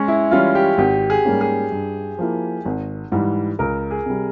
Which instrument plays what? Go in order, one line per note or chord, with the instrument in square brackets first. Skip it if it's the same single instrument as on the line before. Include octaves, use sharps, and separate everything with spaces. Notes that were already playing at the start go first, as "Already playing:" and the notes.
Already playing: [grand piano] G#3 C#4
E4
[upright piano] E3 G3 C#4 [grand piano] F4
[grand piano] G4
[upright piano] G#1 [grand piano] G4
[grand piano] G#4
[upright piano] G#2 G3 A#3 C#4
[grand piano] G#4
[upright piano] G2
F3 A#3 E4
G#1
G#2 E3 G3
[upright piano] C#2 [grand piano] A#4
[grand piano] G#4
[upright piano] C3 G3